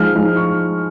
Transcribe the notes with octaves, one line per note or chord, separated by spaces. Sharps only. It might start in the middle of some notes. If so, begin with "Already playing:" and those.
Already playing: F3 G#3 D#4 F6
F3 G#3 D#4
C#6